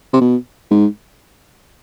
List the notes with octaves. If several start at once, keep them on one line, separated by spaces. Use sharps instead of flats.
C3
B2
G#2